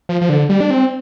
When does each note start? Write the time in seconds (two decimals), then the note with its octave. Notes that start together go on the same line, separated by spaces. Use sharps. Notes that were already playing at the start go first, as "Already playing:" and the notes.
0.09 F3
0.21 F3
0.29 D3
0.49 G3
0.60 D4
0.71 C4